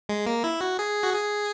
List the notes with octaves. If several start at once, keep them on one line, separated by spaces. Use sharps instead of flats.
G#3
A#3
E4
F#4
G#4
F#4
G#4